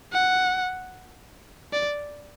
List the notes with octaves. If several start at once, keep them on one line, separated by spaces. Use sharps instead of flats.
F#5
D5